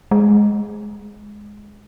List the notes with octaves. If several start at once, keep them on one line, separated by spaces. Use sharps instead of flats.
G#3